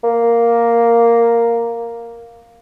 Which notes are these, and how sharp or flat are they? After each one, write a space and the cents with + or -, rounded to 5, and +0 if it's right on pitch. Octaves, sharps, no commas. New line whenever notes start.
A#3 +0